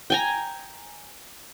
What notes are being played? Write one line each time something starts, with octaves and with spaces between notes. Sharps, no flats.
G5 G#5 A#5